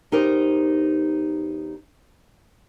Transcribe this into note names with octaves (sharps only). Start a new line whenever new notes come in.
E2 D#4 G4 A#4 C5